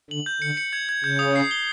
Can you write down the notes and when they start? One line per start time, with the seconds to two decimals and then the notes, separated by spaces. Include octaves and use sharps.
0.10 D3 F#7
0.26 G6
0.41 D3 C#7
0.57 C#7
0.73 G#6
0.89 G#6
1.04 C#3 G6
1.19 D#6
1.36 C7
1.51 G7